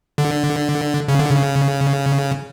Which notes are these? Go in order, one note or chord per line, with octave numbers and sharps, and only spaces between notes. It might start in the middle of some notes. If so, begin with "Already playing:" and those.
D3
C#3
D3
C#3